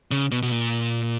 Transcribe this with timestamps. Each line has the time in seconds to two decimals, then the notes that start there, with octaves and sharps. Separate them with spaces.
0.11 C#3
0.32 B2
0.42 B2
0.51 A#2